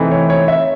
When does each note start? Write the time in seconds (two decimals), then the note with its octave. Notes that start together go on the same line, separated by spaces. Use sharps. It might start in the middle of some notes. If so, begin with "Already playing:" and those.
Already playing: C3 E3 A3 C4 D#4
0.11 C#5
0.30 C#5
0.48 E5